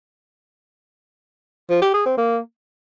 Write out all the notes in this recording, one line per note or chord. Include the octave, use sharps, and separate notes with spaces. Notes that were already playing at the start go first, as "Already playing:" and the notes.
F3
G4
G#4
C4
A#3